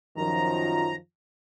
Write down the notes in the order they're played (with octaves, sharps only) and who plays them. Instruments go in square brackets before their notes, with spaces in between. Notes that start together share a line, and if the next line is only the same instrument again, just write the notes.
[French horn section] F#2 D#3 F3 [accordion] A#5